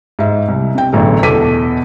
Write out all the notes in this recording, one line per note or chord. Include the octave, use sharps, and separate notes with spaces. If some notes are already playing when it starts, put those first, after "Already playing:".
G#2 E5
C2
C3 G5
E1 A1 F#2 D3
E2 B2 A4 D6 B6 D#7